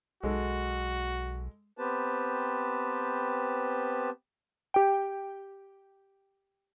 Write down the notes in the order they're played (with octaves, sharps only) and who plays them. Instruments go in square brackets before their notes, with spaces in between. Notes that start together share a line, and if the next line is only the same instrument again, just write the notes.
[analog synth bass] B1 [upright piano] G#3 A4 [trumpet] F#4
[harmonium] B3 C4 G4 B4 C5 A5
[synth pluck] G4 G5